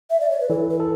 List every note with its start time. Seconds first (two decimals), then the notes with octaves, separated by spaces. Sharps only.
0.10 E5
0.21 D5
0.30 C#5
0.41 B4
0.50 E3 A4
0.70 B4
0.80 A4